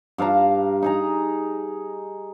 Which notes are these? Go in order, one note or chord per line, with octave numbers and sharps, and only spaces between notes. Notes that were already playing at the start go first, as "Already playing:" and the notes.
G2 F5 A5 A#5
D#4 G#4 A#5